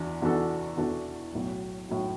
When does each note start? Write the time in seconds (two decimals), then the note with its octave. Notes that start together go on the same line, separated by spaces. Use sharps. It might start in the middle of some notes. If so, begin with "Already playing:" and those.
Already playing: E2 E3 D4 F#4
0.22 E2 E3 D4 F#4 A4
0.77 E2 E3 D4 F#4 A4
1.34 B1 A2 F#3
1.89 A2 F#3